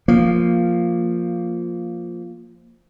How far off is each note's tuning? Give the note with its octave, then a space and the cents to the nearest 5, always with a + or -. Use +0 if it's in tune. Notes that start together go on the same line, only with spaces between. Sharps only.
F3 +0 A#3 -10